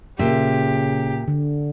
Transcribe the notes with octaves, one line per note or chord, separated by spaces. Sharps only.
A#2 C#3 G4 E5
D3